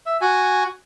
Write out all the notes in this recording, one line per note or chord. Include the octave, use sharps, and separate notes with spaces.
E5
F#4 G#5